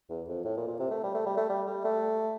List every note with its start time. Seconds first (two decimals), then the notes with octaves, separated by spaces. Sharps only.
0.09 E2
0.28 F2
0.45 A2
0.57 A#2
0.68 A#2
0.79 C3
0.91 A3
1.03 G3
1.14 A3
1.26 G3
1.37 A3
1.49 G3
1.67 G3
1.84 A3